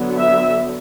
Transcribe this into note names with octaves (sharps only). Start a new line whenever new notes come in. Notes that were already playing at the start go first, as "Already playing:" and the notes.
Already playing: D3 F#3 B3
E5